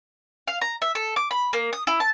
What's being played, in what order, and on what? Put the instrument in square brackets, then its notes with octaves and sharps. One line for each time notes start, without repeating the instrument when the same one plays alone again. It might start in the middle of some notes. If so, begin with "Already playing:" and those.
[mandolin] F5
A#5
E5
A4
D6
B5
A#3
D#6
E4
A5